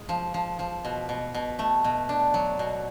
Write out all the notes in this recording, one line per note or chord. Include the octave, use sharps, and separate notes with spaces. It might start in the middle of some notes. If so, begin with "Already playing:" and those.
Already playing: G#3
F3
F3
F3
B2
B2
B2
A3
B2
D4
F#3
B2